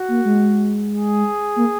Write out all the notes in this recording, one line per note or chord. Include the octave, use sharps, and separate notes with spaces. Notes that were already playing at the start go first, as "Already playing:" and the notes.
Already playing: F#4
A#3
G#3
G#4
A#3